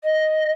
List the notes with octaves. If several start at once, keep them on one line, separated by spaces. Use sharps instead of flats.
D#5